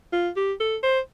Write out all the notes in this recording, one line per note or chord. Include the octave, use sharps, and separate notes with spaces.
F4
G4
A4
C5